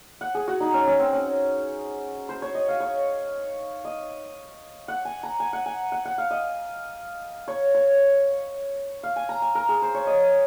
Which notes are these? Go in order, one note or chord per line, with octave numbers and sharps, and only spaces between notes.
F#5
G#4
F#4
D#4
C#4
C#4
C4
C#4
C5
C#5
D#5
F5
C#5
D#5
F#5
G#5
A#5
G#5
F#5
G#5
F#5
F#5
F5
D#5
C#5
C#5
F5
G#5
A#5
G#5
A#4
G#4
C5
C#5
D#5